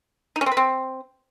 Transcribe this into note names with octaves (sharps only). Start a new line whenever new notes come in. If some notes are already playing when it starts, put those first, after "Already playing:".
D#4
C#4
C4
B4
C4